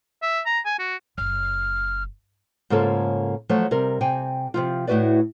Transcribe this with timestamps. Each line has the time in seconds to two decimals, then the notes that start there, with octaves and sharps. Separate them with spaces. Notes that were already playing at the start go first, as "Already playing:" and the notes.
0.22 E5
0.46 A#5
0.66 G#5
0.79 F#4
1.18 F#1 F6
2.70 G#2 C#3 A#3 F4 A4 C#5
3.49 F3 F#3 A3 C#5
3.71 C3 G3 A#4
4.01 C3 G5 G#5
4.54 C3 F3 F4
4.87 A2 A3 E4 F#4 B4 D5